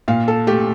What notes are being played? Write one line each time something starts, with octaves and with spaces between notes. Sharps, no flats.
A#2 F5
A4
A3 G4